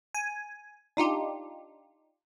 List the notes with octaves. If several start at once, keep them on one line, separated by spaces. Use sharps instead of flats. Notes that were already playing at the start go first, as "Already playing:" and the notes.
G#5
D4 D#4 F4 G4